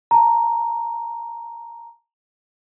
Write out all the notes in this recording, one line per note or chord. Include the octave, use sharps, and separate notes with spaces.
A5 A#5